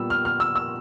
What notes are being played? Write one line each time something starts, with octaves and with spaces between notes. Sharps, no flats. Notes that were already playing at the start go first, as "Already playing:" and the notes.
Already playing: A#2 G3 B3 E6
F6
F6
E6
E6